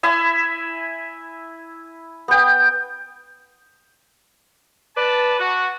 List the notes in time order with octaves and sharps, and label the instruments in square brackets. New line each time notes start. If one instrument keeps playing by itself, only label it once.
[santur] E4 E5 G#5
B3 G5
[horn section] B4 D5 A5
F#4